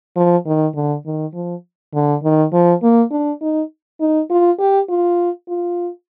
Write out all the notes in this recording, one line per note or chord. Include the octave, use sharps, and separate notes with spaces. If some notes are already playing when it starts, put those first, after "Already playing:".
F3
D#3
D3
D#3
F3
D3
D#3
F3
A#3
D4
D#4
D#4
F4
G4
F4
F4